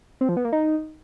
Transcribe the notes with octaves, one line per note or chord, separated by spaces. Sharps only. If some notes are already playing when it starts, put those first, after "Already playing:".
C4
F3
B3
A#3
D#4